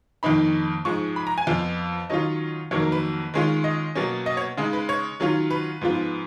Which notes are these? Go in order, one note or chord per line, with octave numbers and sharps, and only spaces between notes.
F2 D#3 A#3 D#4 B5
G#2 F3 G#3 C#6
B5
A#5
G#5
F2 F3 B3 F4 F5
D#3 F#3 C#4 F4 D#5
F2 D#3 F#3 A#3 C#5
A#4
B4
D#3 G#3 C#4 F4
D#5
B2 F#3 A#3 C#4
D#5
C#5
C#3 G#3 D#4
B4
C#5
D#3 F#3 C#4 F4
B4
G#2 F3 B3 F4